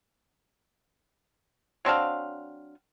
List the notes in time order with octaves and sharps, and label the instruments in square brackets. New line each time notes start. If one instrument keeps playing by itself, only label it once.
[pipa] F#3 C4 D4 F5